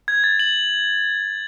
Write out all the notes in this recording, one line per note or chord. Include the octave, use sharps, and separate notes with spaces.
G#6
A6
F#7